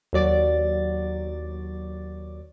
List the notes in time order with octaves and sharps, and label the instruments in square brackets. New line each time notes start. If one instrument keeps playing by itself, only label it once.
[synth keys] D#2 F#3 D5 D6 A6